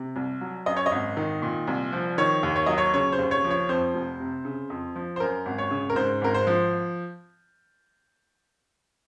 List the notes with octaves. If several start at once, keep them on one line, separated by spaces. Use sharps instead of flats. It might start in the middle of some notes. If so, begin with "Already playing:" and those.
Already playing: C3
C2
F#3
F#2 D#5
C#5
D#5
G#1
D#3
A#2
C2
F3
D#3 C#5
D#2
C#5
F#3 D#5
C#5
C#3 C#5
C5
D#2
C#5
F3
C#5
F2 C5
F1
C3
C#3
F2
F3
C5
F#2 A#4
G#1
C#5
C#3
A#4
G#2 C5
G#1 A#4
C5
F3